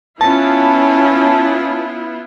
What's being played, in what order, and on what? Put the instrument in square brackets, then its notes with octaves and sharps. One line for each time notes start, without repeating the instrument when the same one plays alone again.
[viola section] B3 E4 F4 [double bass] C#4 [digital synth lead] A5